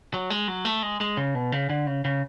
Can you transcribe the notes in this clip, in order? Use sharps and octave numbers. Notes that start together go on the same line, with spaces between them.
F#3
G#3
F#3
A3
G#3
G#3
C#3
B2
C#3
D3
C#3
C#3